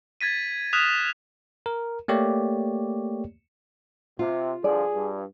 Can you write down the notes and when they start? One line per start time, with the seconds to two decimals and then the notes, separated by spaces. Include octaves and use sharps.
0.21 G#6 A6 B6 D#7
0.73 D#6 F6 F#6 B6 E7 F7
1.66 A#4
2.08 A3 A#3 G4 C#5 D5
4.19 C3 F4
4.64 G2 D3 F3 G#4 D5
4.94 G2